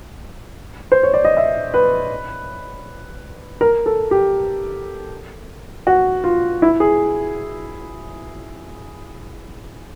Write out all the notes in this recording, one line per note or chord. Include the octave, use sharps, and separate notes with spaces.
C5
C#5
D5
D#5
E5
B4
A#4
A4
G4
F#4
F4
E4
G#4